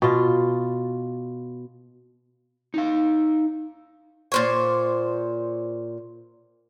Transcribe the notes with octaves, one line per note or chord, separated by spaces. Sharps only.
B2 F4
D#4 F5
A#2 C5 C#5